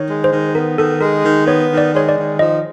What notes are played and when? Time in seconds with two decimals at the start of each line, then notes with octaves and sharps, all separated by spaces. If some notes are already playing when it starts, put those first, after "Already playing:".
Already playing: D#3 C#5
0.09 G#3
0.24 C5
0.32 D#3
0.55 B3 A#4
0.78 D#3 A4
1.01 G#3 A#4
1.24 D#3
1.47 B3 C#5
1.70 D#3
1.78 D5
1.93 G#3 C#5
2.09 D5
2.16 D#3
2.39 F3 D#5